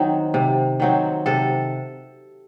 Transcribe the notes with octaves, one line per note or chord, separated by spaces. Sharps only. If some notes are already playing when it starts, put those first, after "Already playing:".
Already playing: D#3 F#3 C4
C3
D#3 F#3 C4
C3 A4